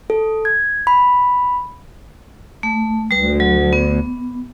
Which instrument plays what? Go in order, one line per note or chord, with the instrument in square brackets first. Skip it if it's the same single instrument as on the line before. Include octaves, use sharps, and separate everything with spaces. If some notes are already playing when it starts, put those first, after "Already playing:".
[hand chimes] A4
G#6
B5
[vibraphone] A3
[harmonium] D2 [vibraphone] G3 B4
[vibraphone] F#3
B3